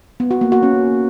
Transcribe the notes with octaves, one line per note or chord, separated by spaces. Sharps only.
B3
F#4
A#3
F#4
C#4